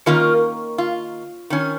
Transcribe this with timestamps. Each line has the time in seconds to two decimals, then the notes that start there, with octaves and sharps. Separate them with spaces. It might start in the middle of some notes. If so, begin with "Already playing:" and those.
0.06 D#3 A#3 C#4 F4 A#4
0.78 F4
1.50 D#3 C#4